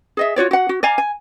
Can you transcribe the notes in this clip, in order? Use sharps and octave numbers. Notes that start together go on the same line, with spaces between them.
G#4 D#5 E5
F4 F#4 C#5 D5
F#4 F#5
F#4
D5 F5 G#5 A#5
G#5